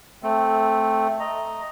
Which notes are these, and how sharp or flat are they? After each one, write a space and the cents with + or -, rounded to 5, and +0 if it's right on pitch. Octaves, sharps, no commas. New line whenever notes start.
A3 +0 C4 +0
D#5 +0 A#5 +0